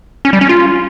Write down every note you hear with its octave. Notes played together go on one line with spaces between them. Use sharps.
C#4
G3
C#4
F4